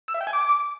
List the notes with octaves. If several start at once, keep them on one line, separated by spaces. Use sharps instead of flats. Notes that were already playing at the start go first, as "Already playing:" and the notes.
E6
E5
G5
G#5
D6